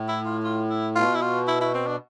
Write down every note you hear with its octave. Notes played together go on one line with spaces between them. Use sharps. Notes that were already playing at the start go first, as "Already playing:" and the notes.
Already playing: A2
E4
F4
F4
E4
B2 F4
E4
F4
E4
E4
C4
D4